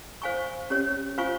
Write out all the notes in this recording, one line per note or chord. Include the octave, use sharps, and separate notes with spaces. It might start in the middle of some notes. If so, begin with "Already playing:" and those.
C5 F5 G#5 C#6
C#4 G4 C#5
F4 C5 F5 G#5 C#6